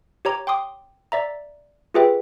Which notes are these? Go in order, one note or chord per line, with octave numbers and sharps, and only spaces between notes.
G4 C#5 A#5 D6
G5 C6 D6 D#6
D5 E5 A#5
F4 G4 G#4 B4 E5 G5